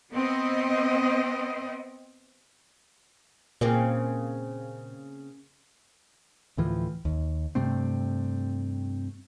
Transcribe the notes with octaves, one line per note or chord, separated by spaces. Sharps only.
B3 C4 D#5
A#2 C#3 A#3 C4
D2 A2 E3 F3
D#2
G2 C3 A3 C4